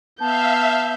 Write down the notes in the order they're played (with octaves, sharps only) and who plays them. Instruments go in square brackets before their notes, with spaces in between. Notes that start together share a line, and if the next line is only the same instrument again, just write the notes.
[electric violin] B3 G6 [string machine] E5 F5 [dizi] A5